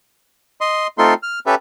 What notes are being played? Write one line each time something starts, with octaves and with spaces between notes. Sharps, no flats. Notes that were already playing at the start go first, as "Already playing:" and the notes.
D#5 C6
A3 C4 D#4 F4 A4 C6
F6
C#4 G4 A4 B4 E5